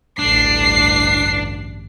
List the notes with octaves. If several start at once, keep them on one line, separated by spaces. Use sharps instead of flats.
A1 D2 G2 D4 C7